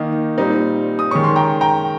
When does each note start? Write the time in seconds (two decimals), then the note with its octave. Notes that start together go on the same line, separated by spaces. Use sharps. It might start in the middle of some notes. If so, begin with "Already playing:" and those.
Already playing: D#3 A#3 D#4 D#5
0.38 A#2 G3 C4 D#4
0.99 D#6
1.11 D#3 G#3 C#4 C#6
1.24 C6
1.36 G5 A#5
1.61 G5 A#5